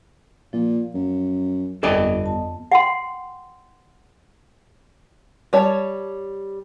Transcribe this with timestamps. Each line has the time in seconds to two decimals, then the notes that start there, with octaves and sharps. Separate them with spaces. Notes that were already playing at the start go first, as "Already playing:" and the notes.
0.53 A#2 F3
0.94 F#2
1.83 G1 F2 B3 A4 D5 D#5
2.26 A5
2.72 F#5 G5 C6
5.53 G3 C#5 A5